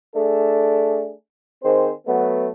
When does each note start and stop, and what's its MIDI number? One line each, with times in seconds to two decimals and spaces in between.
0.15 1.12 57
0.15 1.12 62
0.15 1.12 68
0.15 1.12 69
1.63 1.91 51
1.63 1.91 60
1.63 1.91 68
1.63 1.91 72
2.07 2.50 54
2.07 2.50 57
2.07 2.50 59